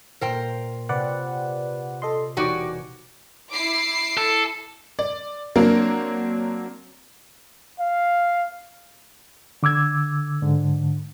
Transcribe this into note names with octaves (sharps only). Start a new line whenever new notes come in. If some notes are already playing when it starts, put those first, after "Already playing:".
A#2 A#3 A#4 C5 G5
C3 F4 G4 B4 D5 F#5
A4 D5 D#5 C6
E1 D#4 F#4 G4 C#5 D5 D6 G#6
E4 D6 C7
A4
D5
F#3 A#3 C4 D4 A#4
F5
D3 D6 E6 G#6
G#2 D3